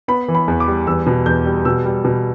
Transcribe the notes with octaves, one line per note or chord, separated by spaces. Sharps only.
B3 B5
E3
B5
E2
D6
G3
E2 E6
B2
E2 G6
G3
B2 E6
G3
B2